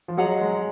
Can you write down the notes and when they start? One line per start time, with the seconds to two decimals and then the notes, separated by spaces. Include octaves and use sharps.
0.08 F3
0.17 F#3 G#4 D#5 F#5 A#5
0.41 G#3